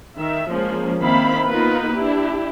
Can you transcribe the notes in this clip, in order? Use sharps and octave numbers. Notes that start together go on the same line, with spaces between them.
D#3 E5
F3 G#3 A#3 C#4
D#3 A#3 C4 E4 F5 B5
A#3 B3 D#4 F4 A#4 B4
D4 E4 G4